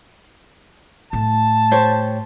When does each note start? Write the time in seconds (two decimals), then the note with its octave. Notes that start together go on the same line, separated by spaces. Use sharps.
1.13 A2 A5
1.71 G4 C5 C#5